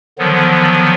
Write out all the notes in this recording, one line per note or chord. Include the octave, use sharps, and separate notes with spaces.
D3 D#3 F3 F#3 B3